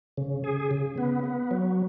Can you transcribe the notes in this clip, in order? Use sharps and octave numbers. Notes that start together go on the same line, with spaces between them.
C#3
G#4
C#3
B3
B3
F#3